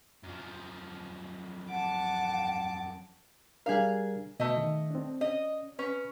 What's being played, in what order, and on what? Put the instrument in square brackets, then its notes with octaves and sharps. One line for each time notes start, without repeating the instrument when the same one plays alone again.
[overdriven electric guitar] F#2 F3
[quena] F#5 [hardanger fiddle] A5 D6
[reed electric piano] G3 D4 A#4 [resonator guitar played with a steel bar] G#4 F5
[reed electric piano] B2 [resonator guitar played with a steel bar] A3 D#5
[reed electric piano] D#3
C4 D4
[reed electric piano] C#4 [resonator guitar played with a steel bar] D#5
[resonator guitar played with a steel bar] C#4 [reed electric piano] B4